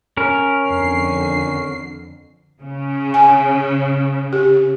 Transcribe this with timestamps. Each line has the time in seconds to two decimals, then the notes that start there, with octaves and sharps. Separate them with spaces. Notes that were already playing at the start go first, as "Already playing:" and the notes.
0.17 C#4 A#4
0.68 F2 D3 C7
2.61 C#3
3.14 G#5
4.33 G4